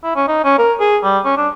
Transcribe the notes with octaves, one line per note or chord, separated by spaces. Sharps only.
E4
C#4
D#4
C#4
A#4
G#4
G3
C#4
D4